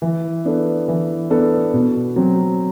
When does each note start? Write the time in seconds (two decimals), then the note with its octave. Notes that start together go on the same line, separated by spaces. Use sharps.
0.02 E3
0.45 B3 D4 A4
0.88 E3
1.30 B3 D4 A4
1.74 B2
2.16 F#3 C4